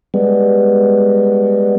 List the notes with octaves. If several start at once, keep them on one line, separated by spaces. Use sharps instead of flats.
G3 G#3 B3